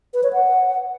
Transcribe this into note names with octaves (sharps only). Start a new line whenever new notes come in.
B4
C#5
F#5